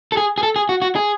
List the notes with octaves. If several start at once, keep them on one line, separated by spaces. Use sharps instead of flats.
A4
G#4
G#4
A4
G#4
F#4
F#4
G#4